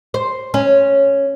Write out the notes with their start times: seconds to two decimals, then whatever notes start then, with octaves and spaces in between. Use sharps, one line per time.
0.14 C5
0.54 C#4